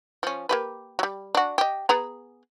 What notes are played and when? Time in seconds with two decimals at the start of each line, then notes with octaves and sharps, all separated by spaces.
0.23 F3 C#4
0.49 A#3 G4 B4
0.99 F#3 G3
1.35 D4 F#4
1.58 G4 D#5
1.89 B3 G#4 A#5